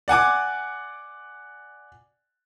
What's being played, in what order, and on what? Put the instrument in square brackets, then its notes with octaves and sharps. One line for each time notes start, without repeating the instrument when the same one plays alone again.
[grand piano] D5 F#5 G#5 D6